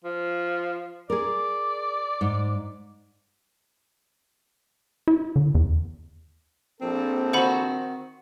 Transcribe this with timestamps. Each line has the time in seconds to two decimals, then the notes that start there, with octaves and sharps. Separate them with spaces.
0.04 F3
1.10 G#4 A#4 D5
2.21 G#2
5.08 E4
5.36 D3
5.55 E2
6.81 A#1 C4 A4
7.33 D#3 F#4 C5 F#5 B5